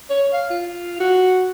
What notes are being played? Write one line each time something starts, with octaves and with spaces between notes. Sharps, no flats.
C#5
F5
F4
F#4